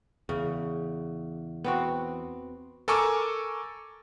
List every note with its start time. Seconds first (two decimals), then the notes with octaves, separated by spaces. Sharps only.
0.29 E2 C#3
1.64 B3 C4 F#4
2.88 A4 A#4 G#5 C#6 D6 E6